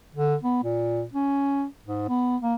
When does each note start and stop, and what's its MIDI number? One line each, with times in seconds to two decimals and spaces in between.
0.15 0.35 50
0.43 0.61 59
0.64 1.05 46
1.14 1.65 61
1.85 2.04 44
2.09 2.37 59
2.42 2.55 58